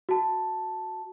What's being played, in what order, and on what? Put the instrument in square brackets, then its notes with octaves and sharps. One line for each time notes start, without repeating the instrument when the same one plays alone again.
[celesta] F#4 A5